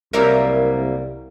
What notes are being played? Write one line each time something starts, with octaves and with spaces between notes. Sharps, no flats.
C2 F#3 G3 A#3 A#4 E5 F5